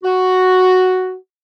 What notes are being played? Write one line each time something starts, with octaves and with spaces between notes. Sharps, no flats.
F#4